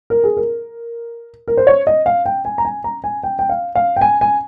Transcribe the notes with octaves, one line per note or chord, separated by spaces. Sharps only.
A#4
G#4
A#4
A#4
C5
C#5
D#5
F5
G5
G#5
A#5
G#5
A#5
G#5
G5
G5
F5
F5
G5
G#5
G#5